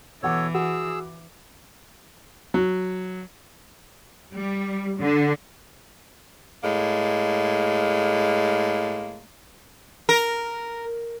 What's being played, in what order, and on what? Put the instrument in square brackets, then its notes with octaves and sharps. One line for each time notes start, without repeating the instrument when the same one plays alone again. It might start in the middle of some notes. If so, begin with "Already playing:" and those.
[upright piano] B2 F#5 D6 [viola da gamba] E3 [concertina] A4 C#5
[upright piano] F#4 F#5 [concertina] G#4 E6
[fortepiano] F#3
[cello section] G3
D3
[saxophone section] A2 G#3 A#3
[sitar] A#4